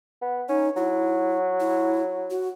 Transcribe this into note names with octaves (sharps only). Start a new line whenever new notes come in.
B3
C#4 D#4
F#3 E4
E4
F#4